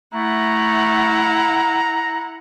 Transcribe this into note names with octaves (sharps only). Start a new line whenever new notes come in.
A3 E4 F#5 A#5